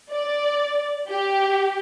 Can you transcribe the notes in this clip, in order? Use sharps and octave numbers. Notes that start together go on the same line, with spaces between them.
D5
G4